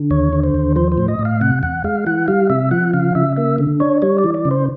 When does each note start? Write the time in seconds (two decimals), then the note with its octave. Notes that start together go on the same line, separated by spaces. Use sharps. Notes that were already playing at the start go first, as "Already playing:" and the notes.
Already playing: D3
0.11 D#2 C#5
0.33 D3
0.43 C5
0.54 D#2
0.76 F3 C5
0.92 C5
0.98 A2
1.08 D#5
1.19 A2
1.25 F5
1.41 C3 F#5
1.63 E2 F#5
1.84 G#3 F5
2.06 E3 F#5
2.28 G3 F5
2.50 C3 E5
2.71 F3 F#5
2.93 C#3 F5
3.15 C#3 E5
3.36 A#3 E5
3.58 D3
3.80 D4 C#5
4.02 G3 C#5
4.18 D5
4.24 E3
4.34 D5
4.45 C#3
4.51 C5